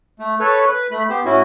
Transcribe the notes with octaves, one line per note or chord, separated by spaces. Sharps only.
A3
A4 B4 C#5
B4
A3 B5
B3 G4 C5
A2 C#4 E4 F#4